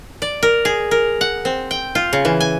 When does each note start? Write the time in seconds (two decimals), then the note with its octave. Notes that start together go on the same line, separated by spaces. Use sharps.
0.22 D5
0.43 A#4
0.65 G#4
0.91 A#4
1.21 F#5
1.45 C4
1.71 G5
1.95 F4
2.13 C#3
2.25 E3
2.40 G#5